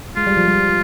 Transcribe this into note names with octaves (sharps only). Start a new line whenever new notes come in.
G#3 F4
G3
F3
G3